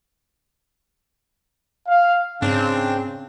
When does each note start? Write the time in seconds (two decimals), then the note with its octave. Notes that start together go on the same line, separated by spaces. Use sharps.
1.88 F5
2.42 G#2 C#3 C4 D4